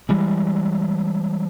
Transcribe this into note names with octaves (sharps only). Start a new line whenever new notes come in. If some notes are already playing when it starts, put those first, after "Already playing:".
E3 G3 G#3